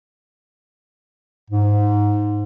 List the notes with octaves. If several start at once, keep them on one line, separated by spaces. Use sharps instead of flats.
G#2